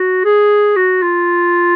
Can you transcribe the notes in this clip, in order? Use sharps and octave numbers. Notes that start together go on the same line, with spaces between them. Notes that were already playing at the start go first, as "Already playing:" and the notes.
Already playing: F#4
G#4
F#4
F4